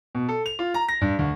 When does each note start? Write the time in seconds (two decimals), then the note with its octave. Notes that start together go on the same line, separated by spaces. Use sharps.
0.15 B2
0.29 A4
0.46 F7
0.59 F4
0.74 A#5
0.88 A#6
1.01 G2
1.19 D2